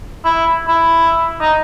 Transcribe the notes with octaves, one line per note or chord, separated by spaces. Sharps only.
E4
E4
D#4